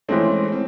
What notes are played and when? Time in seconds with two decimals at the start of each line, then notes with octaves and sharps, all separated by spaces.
0.09 E3 G#3 A3 C4 C#4
0.48 C#4
0.52 C4